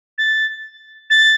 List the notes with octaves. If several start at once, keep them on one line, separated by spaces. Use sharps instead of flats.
A6
A6